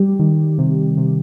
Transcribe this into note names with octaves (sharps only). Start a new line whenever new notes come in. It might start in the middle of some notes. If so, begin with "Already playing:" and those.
Already playing: G3 G4
D#3
C3
C3